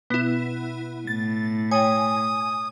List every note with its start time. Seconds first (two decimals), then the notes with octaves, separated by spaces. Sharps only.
0.10 B2 B3 E4
1.07 A2 A6
1.71 C#5 G5 G#5 D#6